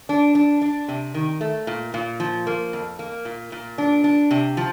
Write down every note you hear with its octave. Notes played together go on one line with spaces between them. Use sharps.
D4
D4
D4
C3
D#3
A3
A#2
A#2
F3
A#3
F2
A#3
A#2
A#2
D4
D4
C3
F3